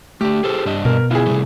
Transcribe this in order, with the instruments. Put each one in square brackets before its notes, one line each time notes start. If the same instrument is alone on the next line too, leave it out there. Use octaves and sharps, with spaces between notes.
[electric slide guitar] A3 D4 [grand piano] G4
[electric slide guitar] G#4 A4 C5
G2 D4 D#5
[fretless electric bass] B2 [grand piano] A#4
[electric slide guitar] B3 F4 [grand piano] E4 G#4
[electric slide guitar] C3 G3 A3